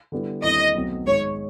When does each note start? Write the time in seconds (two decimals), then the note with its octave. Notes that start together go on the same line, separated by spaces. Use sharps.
0.12 D3 G3 B3 E4
0.43 D#2 D3 G3 C4 E4 D#5
0.75 B1 B2 F#3 A3 C4
1.06 G#2 D#3 G#3 C#5